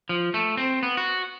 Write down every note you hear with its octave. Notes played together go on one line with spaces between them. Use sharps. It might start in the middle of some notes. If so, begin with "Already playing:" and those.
F3
A3
C4
B3
F#4